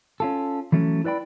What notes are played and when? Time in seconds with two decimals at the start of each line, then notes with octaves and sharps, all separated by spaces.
0.20 C#4 F4 A4
0.72 E3 F#3 A3 C#4
1.04 E4 B4 D5 G5 B5